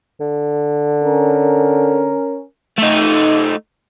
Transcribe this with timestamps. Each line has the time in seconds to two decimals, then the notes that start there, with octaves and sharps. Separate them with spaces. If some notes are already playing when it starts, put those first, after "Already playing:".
0.20 D3
1.03 C#4 A#4
2.78 A3 D#4